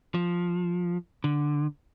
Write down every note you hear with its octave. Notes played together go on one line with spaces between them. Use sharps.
F3
D3